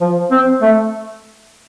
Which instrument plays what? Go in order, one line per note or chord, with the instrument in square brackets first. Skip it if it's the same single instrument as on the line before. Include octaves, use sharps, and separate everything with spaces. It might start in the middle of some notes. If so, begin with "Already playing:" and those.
[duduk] F3
C4
A3